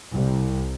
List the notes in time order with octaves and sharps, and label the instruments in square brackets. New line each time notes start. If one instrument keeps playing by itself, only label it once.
[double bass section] C2